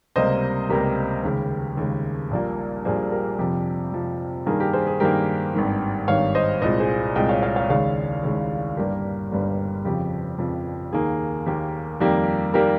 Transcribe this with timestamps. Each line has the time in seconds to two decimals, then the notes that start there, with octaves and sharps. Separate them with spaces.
0.16 C#2 C3 G3 A#3 C5 D#5
0.69 C#2 C3 G3 A#3 G4 A#4
1.24 D#2 C#3 G#3
1.77 D#2 C#3 G#3
2.31 A#1 A#2 G3 A#3
2.85 A#1 A#2 G3 A#3 G#4 C5
3.12 G4 A#4
3.38 F2 C3 F3 G4
3.93 F2 C3 F3
4.46 G2 D#3 A#3 G#4
4.60 G4 A#4
4.73 G#4 C5
4.87 G#4
5.00 G2 D#3 A#3 G4 A#4
5.54 G#1 G2 D#3
6.08 G#1 G2 D#3 C#5 F5
6.35 C5 D#5
6.62 C2 A#2 G#3 C5 D#5
6.80 G#4 C5
7.16 C2 A#2 G#3 D#5 G5
7.29 C#5 F5
7.43 C#5 F5
7.56 C#5 F5
7.70 D#2 C#3 G#3 C#5 F5
8.23 D#2 C#3 G#3
8.77 G1 G2 G3 A#3 G4 A#4
9.31 G1 G2 G3 A#3
9.85 F2 C#3 F3 G4
10.39 F2 C#3 F3
10.93 D#2 D#3 A#3 G#4
11.46 D#2 D#3 A#3 G4
12.00 F2 D#3 G3 A#3 G4
12.54 D#3 G3 A#3 G4 A#4